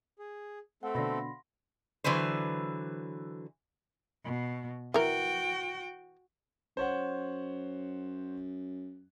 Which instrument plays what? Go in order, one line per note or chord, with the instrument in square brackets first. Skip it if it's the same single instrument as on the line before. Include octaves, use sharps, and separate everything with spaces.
[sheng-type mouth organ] G#4
[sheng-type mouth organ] A3 C4 A4 [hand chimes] F5 F#5
[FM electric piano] B2 D3 [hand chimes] B5 C6 A#6
[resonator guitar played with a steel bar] D3 E3 F#3 B4 C5
[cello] B2
[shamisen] E3 A#4 [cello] F#4 G5
[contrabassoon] F#2 [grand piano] C5 C#5 F#5